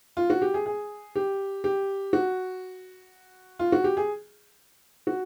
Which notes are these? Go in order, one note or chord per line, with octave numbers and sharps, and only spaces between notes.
F4
F#4
G4
G#4
G#4
G4
G4
F#4
F4
F#4
G4
G#4
F#4